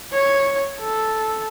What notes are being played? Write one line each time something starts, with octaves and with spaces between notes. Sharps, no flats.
C#5
A4